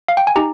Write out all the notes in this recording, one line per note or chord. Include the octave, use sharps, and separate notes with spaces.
F5
G5
G#5
D#4 G4 A#5